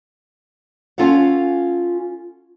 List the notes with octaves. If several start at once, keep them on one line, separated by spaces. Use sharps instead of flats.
C#4 F4 A4 F5 F#5